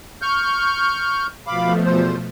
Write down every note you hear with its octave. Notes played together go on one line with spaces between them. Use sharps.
C#6 F6 G6
B2 F3 A3 F5 B5 D6
E2 C5